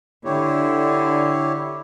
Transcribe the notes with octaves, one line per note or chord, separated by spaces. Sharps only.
D3 E4 G4 C#5